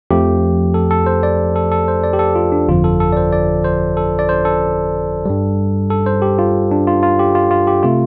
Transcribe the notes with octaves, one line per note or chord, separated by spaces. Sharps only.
F2 F3 A3 G4
A4
A4
C5
D5
A4
A4
C5
D5
G4
A4
F4
D4
G1 F2 D3 F3 F4
A4
A4
D5
C5
D5
C5
A4
D5
C5
A4
G2 G3
A4
C5
G4
F4
D4
F4
F4
G4
F4
F4
G4
C3 A3 F4